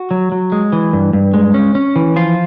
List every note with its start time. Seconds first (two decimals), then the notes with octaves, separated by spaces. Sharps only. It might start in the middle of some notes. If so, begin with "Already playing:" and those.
Already playing: F#4
0.11 F#3
0.32 F#3
0.52 G#3
0.73 E3
0.93 G2
1.13 G2
1.33 G#3
1.54 C#4
1.75 C#4
1.96 E3
2.16 F3 F4